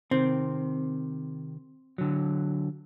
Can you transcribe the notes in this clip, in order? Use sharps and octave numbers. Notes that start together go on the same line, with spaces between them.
C3 D#3 C4
D3 F#3